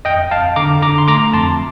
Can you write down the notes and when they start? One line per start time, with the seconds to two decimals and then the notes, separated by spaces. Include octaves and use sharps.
0.05 F2 D#5 G5
0.31 F2 F5 A5
0.56 D3 A#5 D6
0.82 D3 A#5 D6
0.98 C6
1.08 A3 A#5 D6
1.33 F2 A5 C6